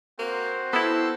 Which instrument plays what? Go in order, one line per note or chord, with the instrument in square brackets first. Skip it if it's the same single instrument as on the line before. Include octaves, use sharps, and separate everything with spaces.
[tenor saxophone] A#3 [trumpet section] C4 F#4 C5
[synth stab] B3 E4 [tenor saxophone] A4